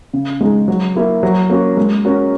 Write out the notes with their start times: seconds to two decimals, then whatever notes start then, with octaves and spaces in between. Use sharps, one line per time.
0.13 C#3
0.41 G#3 D#4 G#4
0.68 F#3
0.95 A#3 E4 A#4
1.23 F#3
1.50 A#3 C#4 F#4
1.77 G#3
2.04 C#4 F#4 A#4